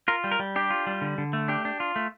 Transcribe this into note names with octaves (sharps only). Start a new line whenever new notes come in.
F4 A#4
G3
A#4
G3
D4 G4
F4
G3
D3
D3
A3
D4 G4
D4
F4
A3